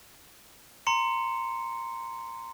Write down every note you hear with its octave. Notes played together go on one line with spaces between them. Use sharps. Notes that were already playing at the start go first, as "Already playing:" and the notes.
A#5 C6 C#7